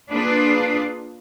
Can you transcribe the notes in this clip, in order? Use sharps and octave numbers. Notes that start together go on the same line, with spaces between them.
A#3 D4 F4 G#4 B4